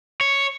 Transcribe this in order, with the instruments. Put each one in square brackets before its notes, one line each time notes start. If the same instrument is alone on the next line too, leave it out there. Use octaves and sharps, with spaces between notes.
[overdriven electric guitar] C#5